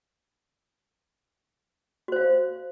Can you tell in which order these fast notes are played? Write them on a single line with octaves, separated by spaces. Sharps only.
F#4 C5 F5